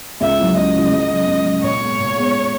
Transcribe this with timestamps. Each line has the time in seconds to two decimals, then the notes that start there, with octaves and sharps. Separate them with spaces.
0.21 C#2 E5
0.39 C#3 F#3 C#4 E4
0.57 C#2 D#5
0.75 C#3 F#3 C#4 E4
0.92 C#2
1.10 C#3 F#3
1.27 C#2
1.45 C#3 F#3
1.62 A#2 C#5
1.81 G#3 B3
1.99 A#2
2.16 G#3 B3